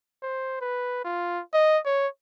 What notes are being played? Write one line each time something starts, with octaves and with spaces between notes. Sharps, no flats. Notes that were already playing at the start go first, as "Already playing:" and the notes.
C5
B4
F4
D#5
C#5